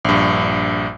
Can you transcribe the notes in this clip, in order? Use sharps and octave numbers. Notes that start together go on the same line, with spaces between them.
A#1 G2